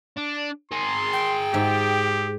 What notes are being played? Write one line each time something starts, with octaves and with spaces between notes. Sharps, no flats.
D4
G#4 A#4 C6
G5
G#2 G4 E5